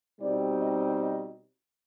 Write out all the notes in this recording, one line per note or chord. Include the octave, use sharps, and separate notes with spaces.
B2 G3 C4 D#4 D5
D#5
D#5